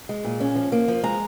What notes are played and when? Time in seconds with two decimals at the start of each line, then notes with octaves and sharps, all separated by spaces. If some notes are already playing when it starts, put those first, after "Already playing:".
0.09 G#3
0.24 A#2
0.40 C#4
0.56 F3
0.72 A#3
0.88 F3
1.03 G#3 A#5